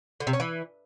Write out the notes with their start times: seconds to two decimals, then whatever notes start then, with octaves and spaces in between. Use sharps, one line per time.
0.20 D3
0.27 C3
0.33 C#4
0.40 E3